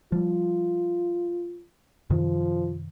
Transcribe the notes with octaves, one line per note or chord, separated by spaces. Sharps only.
F3 G3 F4
F#2 C3 D#3 F3